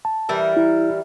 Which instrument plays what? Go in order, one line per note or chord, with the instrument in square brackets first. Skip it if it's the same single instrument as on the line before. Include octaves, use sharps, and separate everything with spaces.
[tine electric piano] A5
[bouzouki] E3 G3 A#4
[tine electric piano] E4